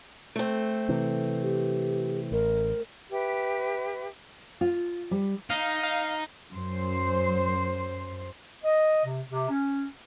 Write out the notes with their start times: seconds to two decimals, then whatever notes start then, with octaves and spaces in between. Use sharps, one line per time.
0.36 A3 C4
0.89 C3 E3
1.43 G4
2.32 A1 A#4
3.11 G4 B4 E5
4.61 F4
5.11 G3
5.50 D#4 F5
5.83 F5
6.53 F#2 C5
8.63 D#5
9.04 C3
9.30 C3
9.49 C#4